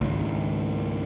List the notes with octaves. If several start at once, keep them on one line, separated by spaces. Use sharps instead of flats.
C#2 G#2 D#3